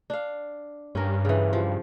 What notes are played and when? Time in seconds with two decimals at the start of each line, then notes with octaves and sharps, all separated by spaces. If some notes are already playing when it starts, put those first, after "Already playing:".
0.10 D4 F5
0.95 G2 C#4 A#4
1.25 C#3 E3
1.53 F3